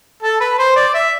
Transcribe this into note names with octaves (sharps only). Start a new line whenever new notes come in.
A4
B4
C5
D5
E5